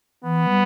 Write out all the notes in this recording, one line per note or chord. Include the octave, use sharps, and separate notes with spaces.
E3 B3
G3